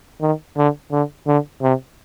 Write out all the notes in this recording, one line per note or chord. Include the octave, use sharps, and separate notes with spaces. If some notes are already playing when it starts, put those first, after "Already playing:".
D#3
D3
D3
D3
C3